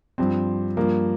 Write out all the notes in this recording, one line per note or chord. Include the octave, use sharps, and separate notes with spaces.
G2 F3 C4
G2 F3 A#3